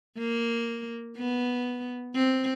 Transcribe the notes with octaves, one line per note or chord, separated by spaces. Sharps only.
A#3
B3
C4